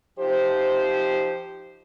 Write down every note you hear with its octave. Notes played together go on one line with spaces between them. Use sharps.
F3 D#4 G4 C5